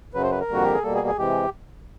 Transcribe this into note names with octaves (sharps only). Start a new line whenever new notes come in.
F#2 C#3 F#3 B4
C5
B4
A#4
F2 D3 G3 A#3 F#4
G4
G#4
B2 G3 A#3 A4
G#4
G#4
C3 E3 G#3 G4